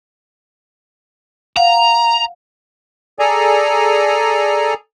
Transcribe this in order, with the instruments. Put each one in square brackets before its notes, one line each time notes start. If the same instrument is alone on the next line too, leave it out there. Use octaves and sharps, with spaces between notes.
[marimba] F5 F#5 [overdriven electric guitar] A#5
[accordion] G#4 A4 D5 G#5 A#5